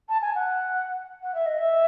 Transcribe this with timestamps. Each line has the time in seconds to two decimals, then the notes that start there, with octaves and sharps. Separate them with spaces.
0.09 A5
0.21 G#5
0.35 F#5
1.23 F#5
1.34 E5
1.46 D#5
1.58 E5